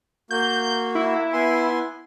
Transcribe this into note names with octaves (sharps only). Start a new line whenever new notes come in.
A#3 F#4 G6
E4
B3 G#5 C6